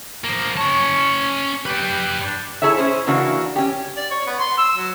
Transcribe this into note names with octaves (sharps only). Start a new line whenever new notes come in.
F3 A#3
C#4 C#5 A5
G4 B4 D5
D4
E4 G#4 A4 C#5 E5
C#4 G#4 C5
C#3 E3 A#3 D4 F#4
C#4 G4
D5
C#5
B3
C6
E6
F#3